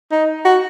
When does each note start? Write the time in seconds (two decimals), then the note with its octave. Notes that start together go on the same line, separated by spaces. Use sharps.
0.11 D#4
0.45 F#4